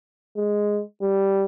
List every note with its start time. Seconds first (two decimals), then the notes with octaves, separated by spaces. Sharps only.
0.37 G#3
1.02 G3